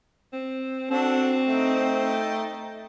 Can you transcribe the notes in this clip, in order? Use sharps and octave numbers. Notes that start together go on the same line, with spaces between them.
C4
C4 D4 F#4 A4
A3 D#4 G5